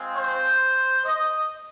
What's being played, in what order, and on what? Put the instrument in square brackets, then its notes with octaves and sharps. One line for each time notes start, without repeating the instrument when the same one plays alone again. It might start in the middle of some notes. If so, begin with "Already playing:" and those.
Already playing: [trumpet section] G#3 C4 F4
C5
D#5